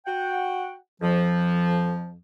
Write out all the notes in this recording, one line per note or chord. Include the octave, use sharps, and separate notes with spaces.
F#4 F#5 G5
F2 F3